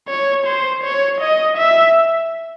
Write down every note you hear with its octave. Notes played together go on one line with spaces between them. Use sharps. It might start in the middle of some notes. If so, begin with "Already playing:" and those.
C#5
C5
C#5
D#5
E5